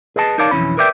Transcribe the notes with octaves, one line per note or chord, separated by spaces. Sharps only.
G#4 B4 D#5 A5
D#4 A#4 C#5 D5 F5 A5
B1 F2 E3 C#4 B5
A#4 B4 D5 E5 G5